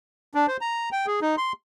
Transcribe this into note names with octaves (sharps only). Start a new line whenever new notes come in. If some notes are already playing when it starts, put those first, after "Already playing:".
D4
C5
A#5
G5
G#4
D#4
C6